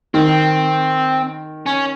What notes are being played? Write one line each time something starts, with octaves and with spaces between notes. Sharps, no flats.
D#3 C4
C#4